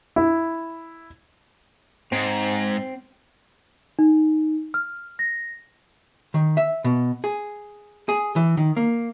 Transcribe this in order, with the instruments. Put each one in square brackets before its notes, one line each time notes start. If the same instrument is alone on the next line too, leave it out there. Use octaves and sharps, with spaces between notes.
[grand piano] E4
[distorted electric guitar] G#2 [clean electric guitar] C4
[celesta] D#4
F6
A#6
[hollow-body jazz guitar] D#3
E5
B2
G#4
G#4
E3
D#3
A#3